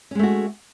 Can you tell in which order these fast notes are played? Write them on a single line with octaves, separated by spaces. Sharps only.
C#4 G#3 A3 F#4